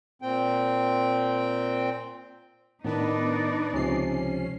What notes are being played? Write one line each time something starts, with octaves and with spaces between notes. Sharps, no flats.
A#2 C4 G5
A2 D#3 B3 D4 D#4 B4 D5
C#2 C3 F3 C#4 C7